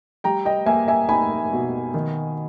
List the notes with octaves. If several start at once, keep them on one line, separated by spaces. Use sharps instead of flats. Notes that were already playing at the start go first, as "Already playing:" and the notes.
G3 G5 A#5
D#5 G5
A#3 E5 G#5
E5 G#5
D#4 G#5 B5
B2
D#3